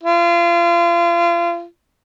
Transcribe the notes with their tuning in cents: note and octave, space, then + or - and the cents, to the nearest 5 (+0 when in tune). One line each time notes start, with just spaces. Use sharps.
F4 -35